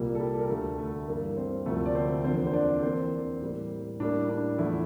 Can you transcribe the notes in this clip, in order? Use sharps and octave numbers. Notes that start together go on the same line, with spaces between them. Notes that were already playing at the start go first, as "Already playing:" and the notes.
Already playing: C2 A#2 G3 A#3
A4
G3 G4
A#4
D2 D3 A3 A4
A3 A4
G2 E3 A#3 A#4
C4 C5
D2 C3 F3 A3 A#3 A4
D5
C4 C5
E2 D3 F3 A#3 C4 C5
C5
D4 D5
E2 E3 A#3 C4 C5
A2 G3 A#3
A2 G3 A#3 D4
D4
E2 D3 F3 A3 E4